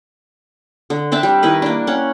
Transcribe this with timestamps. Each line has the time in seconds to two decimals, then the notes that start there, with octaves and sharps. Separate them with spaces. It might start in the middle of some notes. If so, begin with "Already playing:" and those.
0.90 D3
1.12 C4 D4 E5 A5
1.23 G3
1.42 D#3 E4 B4 D#5
1.62 A#3 D4
1.87 C#4 F#5